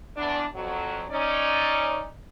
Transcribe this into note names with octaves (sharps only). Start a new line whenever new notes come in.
E2 D4
F2 F#3
C#4 D#4 D5